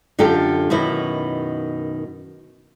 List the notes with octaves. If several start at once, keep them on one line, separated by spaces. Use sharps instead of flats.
F#2 D3 F4 G4 A4 G5
F#2 B2 D#3 E4